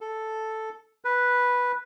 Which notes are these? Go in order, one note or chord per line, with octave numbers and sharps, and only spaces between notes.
A4
B4